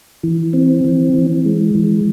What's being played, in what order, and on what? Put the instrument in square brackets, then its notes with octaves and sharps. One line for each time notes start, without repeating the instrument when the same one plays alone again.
[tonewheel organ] E3
C4
E3
E3
G#3
E3